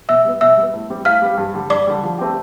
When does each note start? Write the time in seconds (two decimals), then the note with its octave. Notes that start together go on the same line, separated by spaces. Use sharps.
0.09 B2 E5 E6
0.25 G3 B3
0.41 B2 E5 E6
0.57 G3 B3
0.74 A2
0.90 G3 C4 G4
1.05 A2 F5 F6
1.22 G3 C4 G4
1.38 G2
1.54 D3 G3
1.70 G2 D5 D6
1.87 D3 G3
2.03 F3
2.18 A3 C4 G4